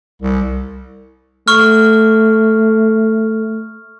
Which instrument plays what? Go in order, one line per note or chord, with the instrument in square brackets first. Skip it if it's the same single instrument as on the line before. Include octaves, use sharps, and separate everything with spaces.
[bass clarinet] C2
[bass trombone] A3 [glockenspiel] C#6 F6